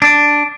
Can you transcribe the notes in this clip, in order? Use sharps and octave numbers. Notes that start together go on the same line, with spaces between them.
D4